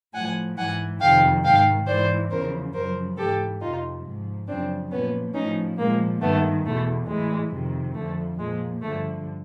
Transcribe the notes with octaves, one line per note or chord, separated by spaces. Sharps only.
A2 F3 F#5 G#5
G#2 E3 F#5 G#5
F2 C3 D#3 F5 G5
G#2 D#3 F5 G5
G#2 E3 C5 D5
E2 C#3 F3 A#4 C5
F#2 C#3 F3 A#4 C5
G#2 E3 G4 A4
F2 C3 F3 D#4 F4
G#2 F3
F#2 C#3 F3 C4 D4
A#2 F3 B3 C#4
A2 F3 C#4 D#4
A#2 F3 G#3 A#3
G2 D#3 A3 B3
E2 B2 A3
A2 E3 G#3
F2 C3 D#3
F2 D3 F3 A3
A#2 F3 G#3
G2 D3 F3 A3